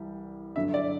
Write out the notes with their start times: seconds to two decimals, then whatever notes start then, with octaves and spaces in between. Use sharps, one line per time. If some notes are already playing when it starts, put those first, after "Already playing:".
Already playing: C2 E3 G3
0.56 G2 D3 F#3 E5
0.74 D5